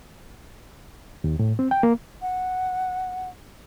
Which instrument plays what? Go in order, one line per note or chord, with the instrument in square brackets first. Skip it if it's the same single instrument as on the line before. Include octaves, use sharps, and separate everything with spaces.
[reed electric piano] D#2
A2
C4
G5
A#3
[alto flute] F#5